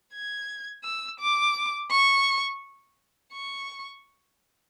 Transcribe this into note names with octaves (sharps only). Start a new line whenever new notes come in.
G#6
E6
D6
C#6
C#6